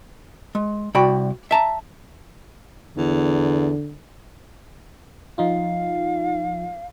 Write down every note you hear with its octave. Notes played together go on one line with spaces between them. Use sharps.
G#3
C2 F#4 D5 G5 B5
E5 A5 A#5
E2 D3
F3 D#4 F4 F5